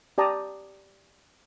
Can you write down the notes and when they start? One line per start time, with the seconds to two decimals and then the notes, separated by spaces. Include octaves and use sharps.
0.18 G4 D5 A5 A#5 D#6